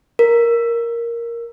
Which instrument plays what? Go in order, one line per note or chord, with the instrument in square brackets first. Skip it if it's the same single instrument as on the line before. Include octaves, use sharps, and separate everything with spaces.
[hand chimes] A#4